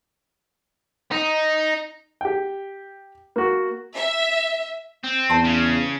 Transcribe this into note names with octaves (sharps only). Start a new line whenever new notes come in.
D#4
G4 G5
A#3 F#4
E5
C4
E2 A5 C6
C#3